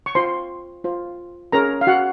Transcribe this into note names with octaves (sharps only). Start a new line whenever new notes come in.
C#6
F4 C5 C6
F4 C5
C#4 G#4 A#4 C#5 A#5
F5
F#4 F#5